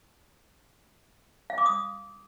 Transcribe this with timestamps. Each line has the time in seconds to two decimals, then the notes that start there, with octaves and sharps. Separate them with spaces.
1.50 F5
1.58 D6
1.66 D#6